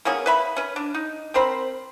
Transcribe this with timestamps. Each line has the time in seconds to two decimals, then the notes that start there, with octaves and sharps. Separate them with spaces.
0.05 A#3 B3 C#4 G#4
0.26 B4 E5 B5
0.56 C#4 B4
0.76 D4
0.95 D#4
1.34 C4 A#4 C5 B5